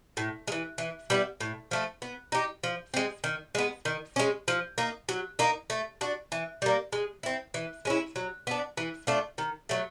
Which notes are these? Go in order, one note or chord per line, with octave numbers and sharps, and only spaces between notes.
A2
G#3
E3
E3
G3 B3 E4
A2
F3 A3
B3
D#4 G4
F3
G#3 C4
D#3
G#3 B3
D#3
G#3 C#4
F3
A#3 D#4
F#3
A#3 D#4
A3
D4 F#4
E3
G3 A#3
G#3
C4 E4
E3
G#3 C#4 E4
F#3
B3 D4
E3
A3 D4 F4
D#3
F#3 A3